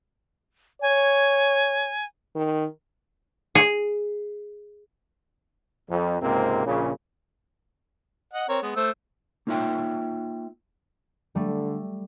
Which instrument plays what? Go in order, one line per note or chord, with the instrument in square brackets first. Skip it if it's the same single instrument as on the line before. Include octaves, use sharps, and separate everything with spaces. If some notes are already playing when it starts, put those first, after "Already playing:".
[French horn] C#5 [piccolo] G#5
[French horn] D#3
[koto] G#4
[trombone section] F2
C#2 G#2 C3 A#3 C4
A#1 A#2 C#3
[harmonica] D#5 F#5
C4 A#4 C#5
G#3 B3
A3 C5 E6
[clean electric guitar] A#3 D#4 F4 C#5 E5 G5
[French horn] D3 [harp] G3 A3